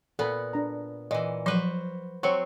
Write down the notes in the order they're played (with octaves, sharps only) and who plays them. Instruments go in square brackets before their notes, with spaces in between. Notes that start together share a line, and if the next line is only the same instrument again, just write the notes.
[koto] A#2 B3 [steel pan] A4 B5
[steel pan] D4 A#5
[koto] A#2 E3 [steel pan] D#5
[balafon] F3 F#3 [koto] F#4 B4 C5
[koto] F#3 C4 [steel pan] C5 C#6